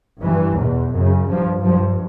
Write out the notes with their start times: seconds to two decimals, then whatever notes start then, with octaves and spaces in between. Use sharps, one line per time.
0.22 G2 E3
0.58 E2 B2
0.93 F#2 C#3
1.28 G2 F3
1.63 G2 F3